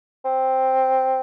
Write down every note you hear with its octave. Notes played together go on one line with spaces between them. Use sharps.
C4